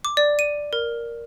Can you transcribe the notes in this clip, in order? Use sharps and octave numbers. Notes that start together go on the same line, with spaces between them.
D6
D5
D#7
A#4